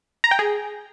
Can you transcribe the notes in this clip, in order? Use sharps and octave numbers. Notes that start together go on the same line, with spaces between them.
A#5
G5
G#4